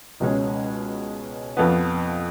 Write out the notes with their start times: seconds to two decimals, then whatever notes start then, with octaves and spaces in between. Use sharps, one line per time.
0.20 C#2 B2 G#3 C#4
1.57 F2 F3 B3